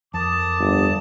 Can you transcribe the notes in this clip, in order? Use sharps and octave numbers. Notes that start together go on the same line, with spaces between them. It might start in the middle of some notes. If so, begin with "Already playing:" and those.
F2 A#4 A5 D6 D#6
G1